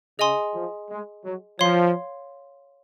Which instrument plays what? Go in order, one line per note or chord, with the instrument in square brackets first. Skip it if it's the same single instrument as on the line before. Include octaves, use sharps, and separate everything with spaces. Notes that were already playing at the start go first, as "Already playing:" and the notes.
[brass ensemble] C#3 [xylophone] G#4 D#5 G#5 C6 D#6
[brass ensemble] F3
G#3
F#3
[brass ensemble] F3 [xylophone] C#5 F5 C6